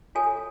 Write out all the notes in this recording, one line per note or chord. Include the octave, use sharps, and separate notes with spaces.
F4 A4 C#5 G#5